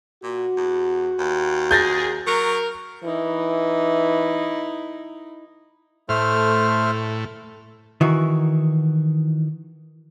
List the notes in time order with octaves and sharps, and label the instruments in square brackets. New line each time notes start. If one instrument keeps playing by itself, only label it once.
[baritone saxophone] A#2 [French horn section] F#4
[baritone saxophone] E2
D#2
[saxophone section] G#4 [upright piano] G6 A6 A#6
[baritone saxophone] F#3 [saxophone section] A#4
[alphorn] E3 [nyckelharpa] D#4 E4
[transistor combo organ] A2 [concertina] A3 C5 F6
[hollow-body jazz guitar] D#3 E3 F#4